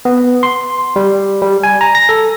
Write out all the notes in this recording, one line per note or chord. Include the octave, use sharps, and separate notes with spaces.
B3
C6
G3
G3
G#5
A#5
A#6
A4